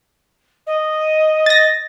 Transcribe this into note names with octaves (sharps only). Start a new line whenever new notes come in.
D#5
A6 A#6